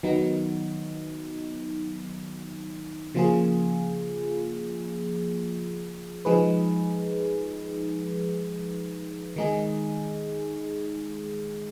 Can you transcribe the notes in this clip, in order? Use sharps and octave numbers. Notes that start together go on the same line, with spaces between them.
D#3 F#3 B3 D#4
C#3 F3 A#3 F4 G#4
F3 G#3 D#4 G#4 B4
D#3 G#3 D#4 G#4